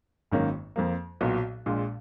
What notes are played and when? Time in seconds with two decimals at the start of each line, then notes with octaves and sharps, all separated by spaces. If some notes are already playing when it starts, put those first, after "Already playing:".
0.32 G#1 F#2 D#3 A#3 C#4
0.76 F2 F3 A#3
1.21 B1 A#2 F#3 B3 F#4
1.66 A#1 A#2 G#3